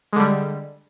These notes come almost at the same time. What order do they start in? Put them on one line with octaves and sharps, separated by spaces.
G#3 D3 G3